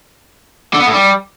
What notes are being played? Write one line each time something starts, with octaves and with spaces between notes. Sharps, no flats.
D3
B3
A2
G3